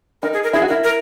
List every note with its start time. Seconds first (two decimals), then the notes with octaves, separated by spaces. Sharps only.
0.22 D#4 A#4
0.33 G#4
0.43 A#4
0.53 E4 G#4
0.62 F#4
0.69 E4 A#4
0.84 A#4